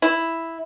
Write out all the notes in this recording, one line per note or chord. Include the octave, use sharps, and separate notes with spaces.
E4